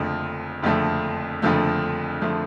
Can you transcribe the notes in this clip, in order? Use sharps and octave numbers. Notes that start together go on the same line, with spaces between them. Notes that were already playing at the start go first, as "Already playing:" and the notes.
Already playing: F#1 F2 D3 F3 A3
F#1 F2 D3 F3 A3
F#1 F2 D3 F3 A3
D3 F3 A3